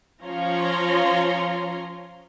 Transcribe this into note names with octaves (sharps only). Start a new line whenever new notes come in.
F3 C#4 F4 C#5 A#5 C6